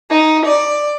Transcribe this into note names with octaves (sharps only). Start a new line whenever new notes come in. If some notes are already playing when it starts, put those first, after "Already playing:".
D#4
D5